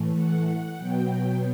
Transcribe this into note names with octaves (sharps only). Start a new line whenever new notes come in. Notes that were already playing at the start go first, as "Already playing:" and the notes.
Already playing: A2 E3 A3
F#5
F#5
B2 F#3 B3 G5